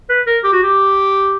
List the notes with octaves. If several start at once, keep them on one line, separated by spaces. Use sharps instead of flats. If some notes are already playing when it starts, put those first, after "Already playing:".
B4
A#4
G4
F#4
G4